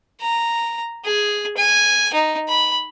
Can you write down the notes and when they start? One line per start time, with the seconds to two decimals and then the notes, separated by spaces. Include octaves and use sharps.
0.21 A#5
1.05 G#4
1.57 G#5
2.14 D#4
2.49 B5